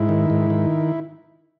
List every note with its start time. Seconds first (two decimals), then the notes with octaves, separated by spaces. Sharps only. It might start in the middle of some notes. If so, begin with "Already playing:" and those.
Already playing: G#2 E4
0.09 D#3
0.30 G#2
0.50 D#3